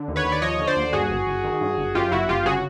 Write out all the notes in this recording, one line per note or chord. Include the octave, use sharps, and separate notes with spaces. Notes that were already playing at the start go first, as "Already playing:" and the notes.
Already playing: D3
D#2
B4 C#5
D#2
D5
F3 C#5 D#5
D3
C5 D5
D#2
G2 F#4 G#4
G1
G1
D#3
G2
G1
F#2 F4 G4
G1 E4 F#4
G1 F4 G4
C#3 F#4 G#4